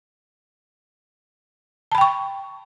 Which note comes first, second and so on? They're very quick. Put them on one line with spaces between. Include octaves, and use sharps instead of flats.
A5 B5 G5 C#6